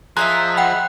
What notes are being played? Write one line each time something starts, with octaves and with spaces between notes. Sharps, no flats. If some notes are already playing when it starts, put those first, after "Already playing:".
F3 G#4 D#5 E5 A#5 F#6
F#5 G5 B5